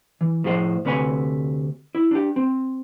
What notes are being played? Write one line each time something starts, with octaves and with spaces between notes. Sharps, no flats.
E3
A2 F3 G#4 A4 C5 D#5
D2 C3 A3 B4 C#5 G#5
E4
D4 G4
C4